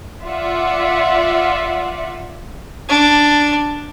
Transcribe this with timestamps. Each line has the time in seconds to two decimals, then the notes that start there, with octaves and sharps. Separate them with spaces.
0.24 F4 D5 E5 F#5
2.89 D4